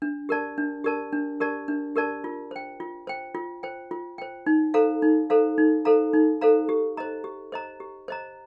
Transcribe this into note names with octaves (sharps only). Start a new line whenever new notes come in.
D4
G4 A#4 D5 A5
D4
G4 A#4 D5 A5
D4
G4 A#4 D5 A5
D4
G4 A#4 D5 A5
F4
C5 G5
F4
C5 G5
F4
C5 G5
F4
C5 G5
D#4
A4 C5 F5 A#5
D#4
A4 C5 F5 A#5
D#4
A4 C5 F5 A#5
D#4
A4 C5 F5 A#5
G4
C5 D#5 A#5
G4
C5 D#5 A#5
G4
C5 D#5 A#5